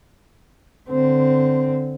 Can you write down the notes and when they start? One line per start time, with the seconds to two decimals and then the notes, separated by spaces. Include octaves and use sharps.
0.90 D3 C4